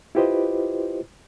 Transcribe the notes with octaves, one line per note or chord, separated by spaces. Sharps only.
E4 F4 G4 B4 C5 D#5